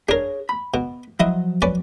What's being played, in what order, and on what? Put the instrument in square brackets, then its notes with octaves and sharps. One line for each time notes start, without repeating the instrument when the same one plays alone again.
[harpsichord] D4 A#4 [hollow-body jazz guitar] G#4 C#5
[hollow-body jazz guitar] B5
[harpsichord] B2
[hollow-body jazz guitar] F3 F#3 [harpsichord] E4 D#5
[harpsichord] C#4 B4 D5